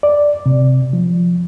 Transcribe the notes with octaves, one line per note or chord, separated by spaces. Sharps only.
D5
C3
F3